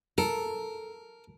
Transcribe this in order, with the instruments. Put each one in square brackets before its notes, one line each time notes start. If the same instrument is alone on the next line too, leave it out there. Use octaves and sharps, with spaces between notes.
[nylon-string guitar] A4 [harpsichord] A#4